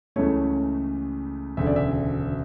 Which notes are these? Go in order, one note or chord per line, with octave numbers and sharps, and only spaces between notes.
C#2 C#3 E3 A3 C#5
E1 D2 C#3 E5
D5
E5